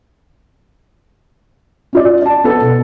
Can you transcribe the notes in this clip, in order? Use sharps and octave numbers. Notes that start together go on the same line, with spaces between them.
C#4 F4 D5
D5 A5
B3 A4 B4
B2